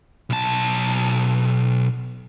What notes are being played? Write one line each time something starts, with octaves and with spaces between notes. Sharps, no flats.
B1 A5